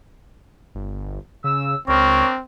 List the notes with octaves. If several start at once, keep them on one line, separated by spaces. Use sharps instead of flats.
G1
C#3 E6
C#2 C4 D4 A#4 C#5